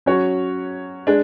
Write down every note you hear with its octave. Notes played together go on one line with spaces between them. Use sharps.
F#3 C#4 F#4 C#5
G#3 D4